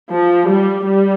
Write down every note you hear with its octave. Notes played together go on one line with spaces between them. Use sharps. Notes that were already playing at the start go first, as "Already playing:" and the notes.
F3
G3
G3